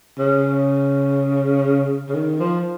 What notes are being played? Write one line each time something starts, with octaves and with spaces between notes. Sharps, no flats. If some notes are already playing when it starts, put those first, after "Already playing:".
C#3
C#3
D#3
F3